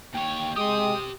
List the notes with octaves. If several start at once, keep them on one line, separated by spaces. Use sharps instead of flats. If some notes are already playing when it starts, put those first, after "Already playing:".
D#2 C#5 G5
G#3 G4 C6 D#6